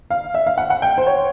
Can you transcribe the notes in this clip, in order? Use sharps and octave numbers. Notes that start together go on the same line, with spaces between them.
F5
E5
F5
F#5
F#5
G5
C5
C#5